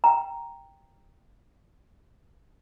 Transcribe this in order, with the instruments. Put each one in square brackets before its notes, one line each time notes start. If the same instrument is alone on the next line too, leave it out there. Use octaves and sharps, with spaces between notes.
[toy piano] G5 A#5